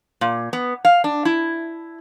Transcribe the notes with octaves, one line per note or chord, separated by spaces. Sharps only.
A#2
B3
F5
D4
E4